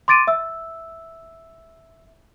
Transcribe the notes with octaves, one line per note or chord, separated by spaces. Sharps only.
C6 D6 A6 D7 D#7
E5 E6